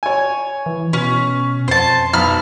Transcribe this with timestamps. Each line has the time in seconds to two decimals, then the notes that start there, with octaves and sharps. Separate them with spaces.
0.03 C#5 G#5
0.66 E3
0.93 B2 C#4
1.68 F2 C5 A5
2.13 B1 A#5 B5 F6